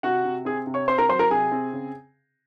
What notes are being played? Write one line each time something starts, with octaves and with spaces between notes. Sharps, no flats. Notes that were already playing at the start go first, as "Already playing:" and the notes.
C3 F#4 F#5
C3
C4 G#4 G#5
C3
C#5 C#6
C4 C5 C6
A#4 A#5
F#3 C5 C6
A#4 A#5
C3 G#4 G#5
C4
C#3